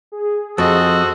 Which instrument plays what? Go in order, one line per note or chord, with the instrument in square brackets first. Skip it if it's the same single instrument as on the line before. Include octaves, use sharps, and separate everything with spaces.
[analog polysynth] G#4
[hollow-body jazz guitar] F2 [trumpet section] F#4 A4 [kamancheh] C5 D#5